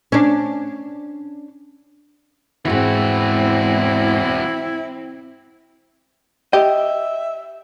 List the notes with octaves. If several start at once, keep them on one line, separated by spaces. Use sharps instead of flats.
C#4 D4
D2 G#2 E3 C4 E4 F#4
G4 D#5 E5